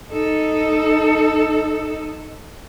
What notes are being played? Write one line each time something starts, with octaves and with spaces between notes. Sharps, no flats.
D#4 A4